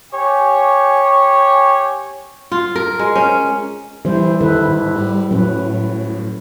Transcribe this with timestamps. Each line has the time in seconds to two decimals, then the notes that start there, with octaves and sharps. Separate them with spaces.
0.12 G4 C#5 G#5
2.52 F4
2.76 A#4
2.99 G#3
3.16 C#4
4.05 E3 G3 E4 C5
4.40 D#3 E4 A4 B4
4.68 G#2
4.96 G3
5.31 A2 F#3 C#4 B4